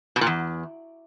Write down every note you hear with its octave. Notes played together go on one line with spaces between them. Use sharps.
B2
A#2
E2